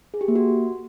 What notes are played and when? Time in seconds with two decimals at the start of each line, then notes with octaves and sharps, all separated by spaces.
0.14 G#4
0.21 G4
0.28 A#3
0.35 F#4